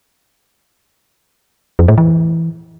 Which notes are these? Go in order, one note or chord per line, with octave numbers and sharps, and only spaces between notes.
F2
A2
E3